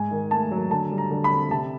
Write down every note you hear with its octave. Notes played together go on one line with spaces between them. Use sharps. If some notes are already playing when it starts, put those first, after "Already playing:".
Already playing: G#2 G#5
D#3
A3 A5
F#3
D3 A5
G3
A#5
D3
B5
C4
C3 A5